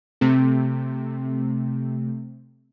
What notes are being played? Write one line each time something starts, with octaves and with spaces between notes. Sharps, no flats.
C3 A3 C4